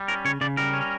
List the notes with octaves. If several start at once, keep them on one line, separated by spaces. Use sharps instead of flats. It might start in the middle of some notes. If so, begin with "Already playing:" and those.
Already playing: G3
C#4 A#4
C#3 C#5
C#3 D5
G3 A#4
C#4